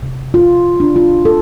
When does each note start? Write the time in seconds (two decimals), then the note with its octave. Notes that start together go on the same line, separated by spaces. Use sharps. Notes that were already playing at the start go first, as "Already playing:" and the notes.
0.02 C3
0.34 F4
0.80 D4
0.96 F4
1.25 A4